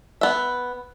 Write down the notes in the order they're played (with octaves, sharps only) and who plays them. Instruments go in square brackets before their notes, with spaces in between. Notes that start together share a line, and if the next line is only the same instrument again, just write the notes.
[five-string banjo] B3 E5